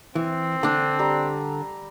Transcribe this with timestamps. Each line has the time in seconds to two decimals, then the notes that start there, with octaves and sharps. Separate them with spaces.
0.15 E3 C4
0.63 D3 D4
0.99 G3 G4 A#5